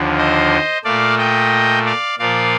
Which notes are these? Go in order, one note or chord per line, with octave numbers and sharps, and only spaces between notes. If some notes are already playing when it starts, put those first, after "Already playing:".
Already playing: D#2 D3 F3
C5 D#5
A#2 A3 D5 F5
D#5 G5
D5 F5
A#2 F3 A#3 D5 F5